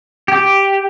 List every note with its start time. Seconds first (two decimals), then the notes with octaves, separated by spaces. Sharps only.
0.28 G4